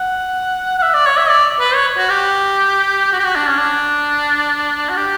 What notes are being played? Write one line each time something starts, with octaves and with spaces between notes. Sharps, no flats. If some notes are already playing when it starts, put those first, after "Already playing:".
Already playing: F#5
F#5
E5
D5
C#5
E5
D5
B4
C#5
F#4
G4
F#4
G4
F#4
D4
C#4
D4
F#4
G4